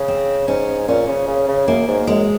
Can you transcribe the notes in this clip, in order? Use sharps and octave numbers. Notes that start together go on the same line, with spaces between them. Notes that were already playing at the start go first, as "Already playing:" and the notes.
Already playing: C#3
C4
G#2 C#4
A#2 C#4
C#3
C#3
C#3
F#2 A#3
G#2
F#2 G#3